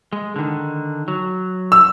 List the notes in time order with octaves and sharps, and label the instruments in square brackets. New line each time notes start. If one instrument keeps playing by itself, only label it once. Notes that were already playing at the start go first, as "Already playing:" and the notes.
[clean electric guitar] G#3
D3 D#3
F#3
[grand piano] E6